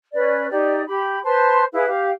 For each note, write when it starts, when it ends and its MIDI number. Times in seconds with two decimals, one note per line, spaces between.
0.13 0.48 61
0.13 0.48 71
0.13 0.48 74
0.50 0.82 63
0.50 0.82 67
0.50 0.82 74
0.87 1.18 67
0.87 1.18 83
1.24 1.63 71
1.24 1.63 72
1.24 1.63 81
1.24 1.63 84
1.73 1.86 64
1.73 1.86 68
1.73 1.86 71
1.73 1.86 77
1.86 2.09 67
1.86 2.09 77